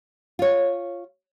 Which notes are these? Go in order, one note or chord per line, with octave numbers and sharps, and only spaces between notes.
F4 C#5